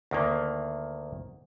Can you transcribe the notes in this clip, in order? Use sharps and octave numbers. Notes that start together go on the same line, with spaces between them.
D2 D#3 A#3